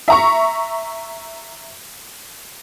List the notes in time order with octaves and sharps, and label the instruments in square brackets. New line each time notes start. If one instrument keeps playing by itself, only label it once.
[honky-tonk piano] E5 A#5 C#6